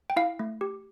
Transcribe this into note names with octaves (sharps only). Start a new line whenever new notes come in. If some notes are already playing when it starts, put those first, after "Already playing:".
G5
E4 F5
A3
G4